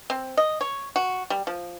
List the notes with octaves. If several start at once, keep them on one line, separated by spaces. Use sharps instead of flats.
C4
D#5
C#5
F#4
G3
F3